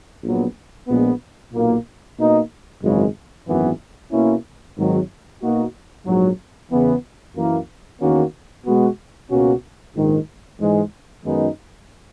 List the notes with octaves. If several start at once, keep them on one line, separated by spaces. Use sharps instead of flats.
A#1 A#2 F#3 B3
A#1 A#2 G#3 B3
B1 A#2 A#3
B2 A#3 D#4
G#1 F#2 C#3 E3 G#3
G#1 F#2 E3 B3
B2 A#3 C#4 E4
G#1 G#2 D#3 F#3
B2 A#3 D#4 F#4
A#1 G#2 F#3
E2 C#3 E3 B3
F#2 E3 A#3 E4
E2 D#3 A#3 C#4 F#4
B2 G#3 B3 F#4
C#2 B2 A#3 C#4 F#4
A#1 G#2 D#3
G#2 E3 G#3
F#2 D#3 G#3 B3 D#4